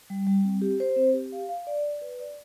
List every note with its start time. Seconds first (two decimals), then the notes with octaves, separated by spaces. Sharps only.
0.10 G3
0.27 G3
0.45 C4
0.62 G4
0.80 C5
0.96 C4
1.14 G4
1.32 F5
1.49 F5
1.67 D5
1.84 D5
2.01 B4
2.20 D5